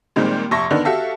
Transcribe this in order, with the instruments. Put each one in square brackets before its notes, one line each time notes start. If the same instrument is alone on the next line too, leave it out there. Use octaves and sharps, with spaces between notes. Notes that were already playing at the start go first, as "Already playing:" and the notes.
[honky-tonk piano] A#2 D#3 G3 G#3 C4 G4
F1 E5 A5 C6 C#6 A#6
D3 D#3 B3 D4
F#4 G4 A4 E5 F5 A5